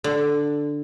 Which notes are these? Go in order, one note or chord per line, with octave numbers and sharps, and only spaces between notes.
D3